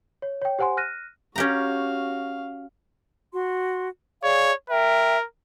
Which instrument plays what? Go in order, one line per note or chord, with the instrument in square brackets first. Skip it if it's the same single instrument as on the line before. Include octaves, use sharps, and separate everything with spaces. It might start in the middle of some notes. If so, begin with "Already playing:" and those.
[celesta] C#5
C#5 G5
G4 C5 F#5 G#5 C6
F6 F#6 A#6 D#7
[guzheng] C#4 G4 A#5 [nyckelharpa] F#4 F5
[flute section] F#4 C6
[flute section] G#4 D5 F5 [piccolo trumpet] C#5
[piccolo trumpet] A#4 [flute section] E5 G5